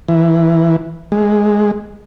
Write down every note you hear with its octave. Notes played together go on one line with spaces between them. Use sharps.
E3
G#3